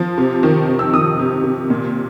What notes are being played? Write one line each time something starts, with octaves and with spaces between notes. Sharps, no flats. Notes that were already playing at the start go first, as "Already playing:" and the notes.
Already playing: F3
C3
D#3
C3
E6
D#3 D#6
C3
C3
A#2